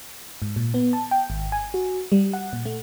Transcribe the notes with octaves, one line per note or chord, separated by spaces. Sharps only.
G#2
A#2
B3
A5
G5
G#1
G#5
F#4
G3
F#5
A#2
A3